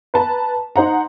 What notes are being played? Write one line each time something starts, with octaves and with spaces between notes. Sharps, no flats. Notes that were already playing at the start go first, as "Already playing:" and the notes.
B4 A5 A#5
D#4 C5 F#5 A#5